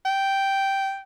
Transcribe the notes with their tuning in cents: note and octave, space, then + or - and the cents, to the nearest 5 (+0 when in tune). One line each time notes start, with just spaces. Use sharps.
G5 -5